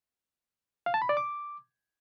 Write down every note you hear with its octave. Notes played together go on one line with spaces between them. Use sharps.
F5
A5
B5
D5
D6